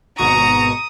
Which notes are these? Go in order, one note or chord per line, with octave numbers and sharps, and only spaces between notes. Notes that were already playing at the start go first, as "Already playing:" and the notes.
G#1 B2 A#5 C#6 D#6